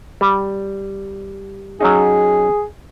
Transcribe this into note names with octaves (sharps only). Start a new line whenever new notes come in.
G3
F#3 C#4 D#4 G#4